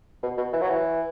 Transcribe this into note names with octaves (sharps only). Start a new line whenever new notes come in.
B2
B2
E3
F#3
E3